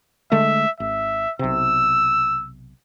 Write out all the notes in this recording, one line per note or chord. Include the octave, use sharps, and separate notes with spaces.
D3 G#3 A3 E5
G#1 E5
B1 C3 E6